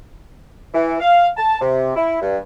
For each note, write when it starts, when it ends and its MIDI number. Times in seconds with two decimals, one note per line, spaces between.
0.74 0.95 52
1.00 1.28 77
1.37 1.60 81
1.61 1.92 48
1.96 2.19 64
2.21 2.38 43